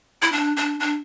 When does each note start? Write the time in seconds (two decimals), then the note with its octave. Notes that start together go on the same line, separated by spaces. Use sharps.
0.22 E4
0.32 D4
0.57 D4
0.80 D4